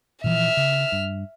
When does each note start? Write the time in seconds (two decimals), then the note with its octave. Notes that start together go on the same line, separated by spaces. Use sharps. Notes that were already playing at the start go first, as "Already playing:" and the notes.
0.24 A#2 E3 F3 E5 F6
0.57 C#3
0.92 G2